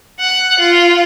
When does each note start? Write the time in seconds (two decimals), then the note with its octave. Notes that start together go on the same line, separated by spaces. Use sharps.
0.20 F#5
0.60 F4